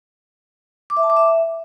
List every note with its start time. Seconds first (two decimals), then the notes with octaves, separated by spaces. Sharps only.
0.90 D6
0.97 E5
1.03 A5
1.10 D6
1.16 E5